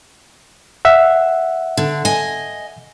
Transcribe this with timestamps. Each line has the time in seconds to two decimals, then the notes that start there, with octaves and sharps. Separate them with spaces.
0.85 E5 F#5
1.77 D3
2.05 D#5 G#5